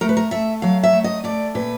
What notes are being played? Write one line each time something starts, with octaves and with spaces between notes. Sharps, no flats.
A3 A#4
B4
A#4
A3 E5
F#3 F5
E5
A3
D#5
A3 D5
A#2 B4